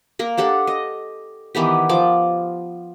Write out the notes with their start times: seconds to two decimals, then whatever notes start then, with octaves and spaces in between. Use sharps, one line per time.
0.19 A#3 A#4
0.38 D4 G4 A4 F#5
0.67 D#5
1.55 D#3 E3 B3 G4
1.89 F3 D6